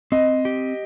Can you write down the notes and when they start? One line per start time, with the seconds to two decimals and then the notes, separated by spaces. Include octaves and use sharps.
0.12 C4 D#5
0.45 G4